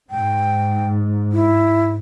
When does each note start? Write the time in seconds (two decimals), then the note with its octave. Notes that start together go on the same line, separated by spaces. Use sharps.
0.10 G#2 G5
1.32 E4